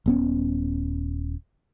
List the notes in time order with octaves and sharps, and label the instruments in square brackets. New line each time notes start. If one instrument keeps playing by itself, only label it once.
[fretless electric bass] D#1 B3 C#4